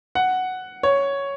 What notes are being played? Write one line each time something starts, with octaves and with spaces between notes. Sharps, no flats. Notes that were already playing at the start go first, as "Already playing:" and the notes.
F#5
C#5